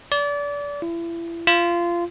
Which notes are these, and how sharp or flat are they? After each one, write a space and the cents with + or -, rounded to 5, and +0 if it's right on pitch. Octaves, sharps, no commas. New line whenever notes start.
D5 -30
E4 +35
F4 -20